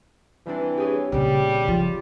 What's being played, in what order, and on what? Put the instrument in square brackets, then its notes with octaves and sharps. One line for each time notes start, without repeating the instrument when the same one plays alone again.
[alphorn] E3 [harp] G3 C4 D4
[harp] G4 G#4 C#5
[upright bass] A#2 C#3 [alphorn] G3
[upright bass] F3 [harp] F4